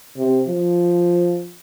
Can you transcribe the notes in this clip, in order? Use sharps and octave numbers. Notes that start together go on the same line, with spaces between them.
C3
F3